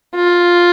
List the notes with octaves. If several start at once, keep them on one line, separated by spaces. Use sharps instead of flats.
F4